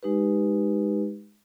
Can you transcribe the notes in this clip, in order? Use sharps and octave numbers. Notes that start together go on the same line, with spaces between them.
G#3 D#4 G4 B4